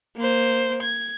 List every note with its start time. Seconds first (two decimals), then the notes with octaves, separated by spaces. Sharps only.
0.17 A#3 C5
0.83 G#6